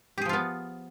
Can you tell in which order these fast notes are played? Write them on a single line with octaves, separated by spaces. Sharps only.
G4 G#4 F3 F4 B3